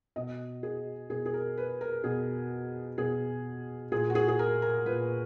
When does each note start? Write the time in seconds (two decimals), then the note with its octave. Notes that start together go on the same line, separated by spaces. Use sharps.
0.16 B2 D#5
0.63 G#4
1.10 B2 G#4
1.26 G#4
1.34 A#4
1.57 B4
1.81 A#4
2.04 B2 G#4
2.98 B2 G#4
3.92 A#2 G#4
4.10 F#4
4.15 G#4
4.28 G#4
4.39 A#4
4.62 A#4
4.86 A#2 B4